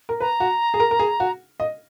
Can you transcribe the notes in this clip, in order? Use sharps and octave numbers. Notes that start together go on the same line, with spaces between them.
A#4
B4 A#5
F#4
G#4
A#4
A#4
G#4
F#4
D#5